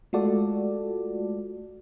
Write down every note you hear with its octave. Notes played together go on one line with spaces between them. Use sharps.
G#3 A3 F4 F#4 A4 D5